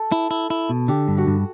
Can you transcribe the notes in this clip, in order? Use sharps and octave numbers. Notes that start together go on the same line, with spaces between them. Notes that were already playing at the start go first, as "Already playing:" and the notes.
Already playing: A4
E4
E4
E4
B2
D3 G4
G2
F#4
G2